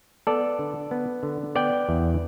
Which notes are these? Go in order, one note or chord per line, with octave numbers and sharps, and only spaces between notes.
B3 A4 D5
D3
B3
D3
B3 D5 G5
E2